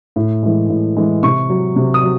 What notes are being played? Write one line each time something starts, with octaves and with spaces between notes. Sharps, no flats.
A2
E3 G#3
A2
E3 G#3
C3 C#6
F#3
C3
D#6
F#3